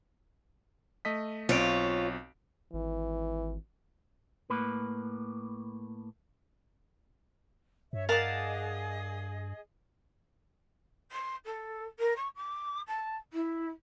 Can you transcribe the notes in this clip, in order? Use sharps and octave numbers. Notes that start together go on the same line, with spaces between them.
A3 D#5 B6
B1 C4 F4 C#5 D7
G#1 E3
A2 A#3 B4
G2 C#5 E5
G#4 A#4 D5 D#5 F5 F#5 A5
C6
A4
A#4
C#6
D6
A5
E4